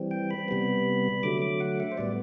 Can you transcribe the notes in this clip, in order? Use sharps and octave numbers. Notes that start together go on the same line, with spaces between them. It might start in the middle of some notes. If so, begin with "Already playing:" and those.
Already playing: E3 G3 C4
G5
B5
C3 G3 B3
D3 F#3 A3 D6
D6
F#5
E5
C5
A2 G3 B3 D5